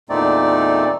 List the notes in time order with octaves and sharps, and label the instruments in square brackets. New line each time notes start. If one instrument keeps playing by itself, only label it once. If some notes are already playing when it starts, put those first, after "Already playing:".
[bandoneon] E2 A#2 A3 C4 D#4 D5